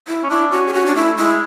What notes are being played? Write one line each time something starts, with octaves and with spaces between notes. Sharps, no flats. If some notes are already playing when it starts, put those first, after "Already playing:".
E4
C#4
D4 E4
C#4 F#4
G#4
C#4 F#4
D4
A3 E4
G#3 E4